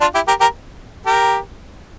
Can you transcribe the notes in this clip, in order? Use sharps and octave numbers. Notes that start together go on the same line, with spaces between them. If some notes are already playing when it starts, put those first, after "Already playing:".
D4 F4
E4 G4
G4 A#4
G4 A#4
G4 A#4